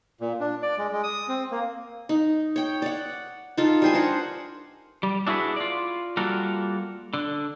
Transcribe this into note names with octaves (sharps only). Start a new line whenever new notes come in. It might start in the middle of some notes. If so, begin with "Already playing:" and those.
A#2
D4
D5
G#3
G#3
D#6
C4
A#3
D#4
C#5 G5
D5 F#5
D#4 F4 A4
G3 C5 G#5
D4 A#4 C5 F#5
G3
D4 E4 F#4 G#4 B4
F4 D5
G3 A#3 F4 F#4 A4 A#4
D3